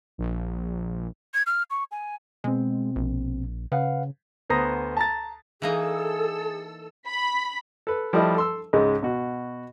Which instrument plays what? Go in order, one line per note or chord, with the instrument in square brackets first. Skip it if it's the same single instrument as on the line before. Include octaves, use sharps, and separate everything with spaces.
[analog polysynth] A#1
[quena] G#6
F6
C#6
G#5
[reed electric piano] B2 C4 [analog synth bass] G#3
[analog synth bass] A#1
[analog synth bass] C#3 [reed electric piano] B4 F5 F#5
[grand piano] D2 B3 C5 A#5 D#6 A#6
A5 A#5 A6
[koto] E3 A#3 D#4 [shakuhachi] G#4 [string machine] A4 E6
[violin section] B5
[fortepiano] A4 B4
F3 G3 A3 E4 D#5
A4 C6 E6
C#2 G#2 G#3
B2 F#4